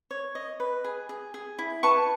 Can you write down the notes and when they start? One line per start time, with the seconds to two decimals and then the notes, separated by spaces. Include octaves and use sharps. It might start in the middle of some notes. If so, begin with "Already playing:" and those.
0.11 C#5
0.35 D#5
0.60 B4
0.84 G#4
1.09 G#4
1.34 G#4
1.59 E4
1.83 B4 A5 C#6